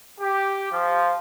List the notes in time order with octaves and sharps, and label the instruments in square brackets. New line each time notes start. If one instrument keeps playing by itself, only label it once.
[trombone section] G4
F3